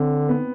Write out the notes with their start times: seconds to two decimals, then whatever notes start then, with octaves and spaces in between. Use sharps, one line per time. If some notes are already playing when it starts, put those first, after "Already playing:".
Already playing: D3 C4
0.29 B3